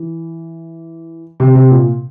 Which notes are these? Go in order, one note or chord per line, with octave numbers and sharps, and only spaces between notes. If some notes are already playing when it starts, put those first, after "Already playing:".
Already playing: E3
C3
C3
A#2